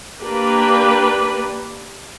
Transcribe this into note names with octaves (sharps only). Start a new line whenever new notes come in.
A#3 D4 G4 B4